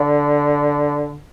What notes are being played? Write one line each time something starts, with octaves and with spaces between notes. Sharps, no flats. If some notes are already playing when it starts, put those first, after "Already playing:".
Already playing: D3